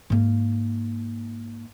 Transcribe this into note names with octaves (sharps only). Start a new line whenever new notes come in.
G#2 A#3